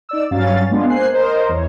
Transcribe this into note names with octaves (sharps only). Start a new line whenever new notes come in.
D#4 D5 E6
G2 F#3 C#4 F5 A6
G#3 B3 D4 F4
A#3 C5 G#5 F#6 C7
A#4 C5 D#5
E2 C#5